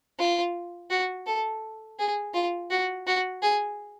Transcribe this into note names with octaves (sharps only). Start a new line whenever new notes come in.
F4
F#4
A4
G#4
F4
F#4
F#4
G#4